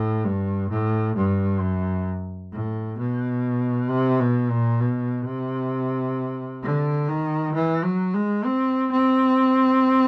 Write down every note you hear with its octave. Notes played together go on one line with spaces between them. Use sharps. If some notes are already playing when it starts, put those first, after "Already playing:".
Already playing: A2
G2
A2
G2
F#2
A2
B2
C3
B2
A#2
B2
C3
D3
D#3
E3
F#3
G#3
C4
C4